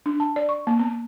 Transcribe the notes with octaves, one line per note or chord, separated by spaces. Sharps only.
D4
A5
D5
C#6
A#3
B3